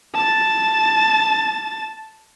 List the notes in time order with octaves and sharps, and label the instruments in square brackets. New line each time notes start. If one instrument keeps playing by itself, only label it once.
[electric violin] A5 A6